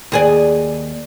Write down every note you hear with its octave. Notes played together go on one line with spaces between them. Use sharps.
D#2 G#4 D5